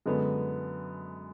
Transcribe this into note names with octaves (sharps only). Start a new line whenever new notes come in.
F#2 D3 G#3 B3